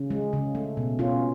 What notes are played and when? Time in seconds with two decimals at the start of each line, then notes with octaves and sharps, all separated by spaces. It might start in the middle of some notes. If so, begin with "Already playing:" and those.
Already playing: C#3
0.10 G#3
0.33 C#3
0.55 A3
0.77 B2
0.99 B2 C#4 F4